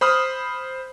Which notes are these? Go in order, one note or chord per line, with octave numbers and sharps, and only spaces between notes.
C5 B5 D#6 F6